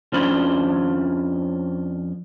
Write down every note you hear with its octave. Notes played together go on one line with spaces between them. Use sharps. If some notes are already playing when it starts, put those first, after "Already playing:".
F2 F3 C#4 D4 C5 B5